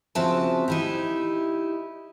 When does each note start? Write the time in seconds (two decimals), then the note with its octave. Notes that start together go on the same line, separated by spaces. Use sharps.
0.15 C#3 F3 C4 F#4 E5 A5
0.68 D#4 E4 G4